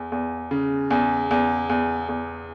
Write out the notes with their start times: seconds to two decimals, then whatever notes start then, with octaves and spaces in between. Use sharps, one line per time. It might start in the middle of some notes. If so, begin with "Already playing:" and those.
Already playing: E2
0.12 E2
0.51 C#3
0.91 E2
1.31 E2
1.70 E2
2.09 E2